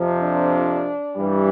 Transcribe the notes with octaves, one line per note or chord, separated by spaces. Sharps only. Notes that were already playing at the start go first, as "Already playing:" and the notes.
Already playing: F2 C3 F3
D4
G2 E3 G3